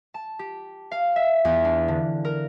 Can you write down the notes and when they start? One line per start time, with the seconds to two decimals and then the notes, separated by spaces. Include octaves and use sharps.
0.14 A5
0.39 G4
0.91 F5
1.16 E5
1.45 E2
1.65 D4
1.88 D3
2.25 A#4